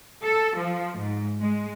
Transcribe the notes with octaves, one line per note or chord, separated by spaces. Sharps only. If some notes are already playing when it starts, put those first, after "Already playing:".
A4
F3
G#2
G#3